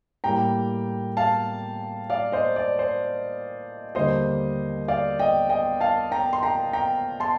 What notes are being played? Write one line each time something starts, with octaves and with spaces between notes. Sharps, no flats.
A2 G3 A#3 G5 A#5
F5 A5
D5 F5
C5 D#5
D5
C5
D#2 D3 G3 A#3 C5 D#5
D5 F5
D#5 G5
D#5 G5
F5 A5
G5 A#5
C6
G5 A#5
G5 A#5
A5 C6